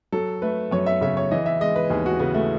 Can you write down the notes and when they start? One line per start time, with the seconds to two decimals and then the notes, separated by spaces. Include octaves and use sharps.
0.12 F#3 A4
0.42 A3 B4
0.71 F#2 C#5
0.86 E5
1.01 C#3 E5
1.17 C#5
1.31 E3 D#5
1.46 E5
1.61 G#3 D#5
1.76 B4
1.90 D#2 G#4
2.06 F#4
2.19 C#3 B3
2.34 A3